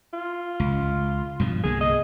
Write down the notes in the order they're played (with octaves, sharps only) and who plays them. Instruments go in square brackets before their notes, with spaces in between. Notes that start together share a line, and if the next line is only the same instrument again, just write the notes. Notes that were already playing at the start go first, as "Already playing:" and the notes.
[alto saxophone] F4
[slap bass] C#2
G2 B2 F3
[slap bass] C2 D3 A#3 [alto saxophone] G#4
[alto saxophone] D#5